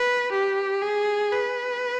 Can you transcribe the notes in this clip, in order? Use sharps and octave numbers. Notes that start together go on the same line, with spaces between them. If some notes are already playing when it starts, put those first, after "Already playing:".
Already playing: B4
G4
G#4
B4